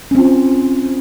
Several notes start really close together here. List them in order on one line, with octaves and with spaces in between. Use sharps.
C#4 C4 F4